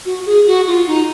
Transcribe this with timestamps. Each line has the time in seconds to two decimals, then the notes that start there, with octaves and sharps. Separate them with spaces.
0.06 F#4
0.26 G#4
0.47 F#4
0.67 F4
0.87 D#4